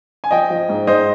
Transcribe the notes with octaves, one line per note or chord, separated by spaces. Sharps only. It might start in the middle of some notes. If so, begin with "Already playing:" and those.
G#5
F3 D#5 G5
F3
G#2
G#2 C5 D#5